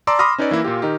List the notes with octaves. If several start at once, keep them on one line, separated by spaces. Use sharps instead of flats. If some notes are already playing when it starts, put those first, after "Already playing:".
D5 A5 A#5 C6 D6 E6
B5 C6 D6 D#6 F6 A#6
C#4 D#4 B4 C#5 D5
E3 A#3 E4
A#2 F4 G4
D#3 D#4 G4